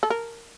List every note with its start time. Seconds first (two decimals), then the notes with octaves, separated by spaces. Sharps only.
0.03 A4
0.10 A#4